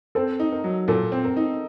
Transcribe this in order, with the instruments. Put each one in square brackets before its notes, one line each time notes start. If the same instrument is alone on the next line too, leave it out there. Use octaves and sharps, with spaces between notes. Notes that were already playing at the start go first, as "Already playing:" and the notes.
[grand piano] C4 [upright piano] A4 C5
[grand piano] D#4
[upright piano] A#4
[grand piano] F#3
[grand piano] A#2 [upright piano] A4
[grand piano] C4
[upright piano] A#4
[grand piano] D#4